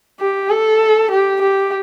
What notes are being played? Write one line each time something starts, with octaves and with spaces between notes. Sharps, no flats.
G4
A4
G4
G4